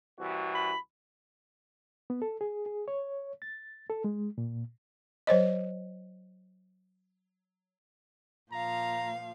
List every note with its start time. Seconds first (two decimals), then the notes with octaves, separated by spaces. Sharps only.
0.17 C2 E3 F#4
0.54 B5
2.10 B3
2.22 A4
2.41 G#4
2.66 G#4
2.88 C#5
3.42 A6
3.90 A4
4.04 G#3
4.38 A#2
5.27 F#3 C5 C#5 D#5
8.52 A#2 F3 F5 A#5